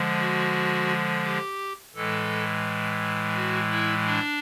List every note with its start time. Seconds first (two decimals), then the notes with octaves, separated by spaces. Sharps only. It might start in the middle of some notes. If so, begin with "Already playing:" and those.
Already playing: D3 F3 G#3
0.19 F#4
1.24 G4
1.95 A2 E3 G#3 A4
3.35 F#4
3.70 E4
4.06 D4